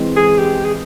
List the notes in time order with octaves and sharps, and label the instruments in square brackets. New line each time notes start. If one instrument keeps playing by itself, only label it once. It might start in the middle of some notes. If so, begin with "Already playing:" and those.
Already playing: [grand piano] E3 G#3 C4
[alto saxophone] G#4
G4
G#4